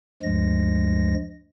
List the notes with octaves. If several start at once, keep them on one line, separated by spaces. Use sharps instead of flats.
D2 G2 F3 G#3 A#6